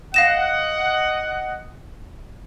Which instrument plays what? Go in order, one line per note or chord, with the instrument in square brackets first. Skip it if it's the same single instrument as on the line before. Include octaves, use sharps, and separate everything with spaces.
[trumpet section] D#5 F#5 [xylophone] F5 A#6 E7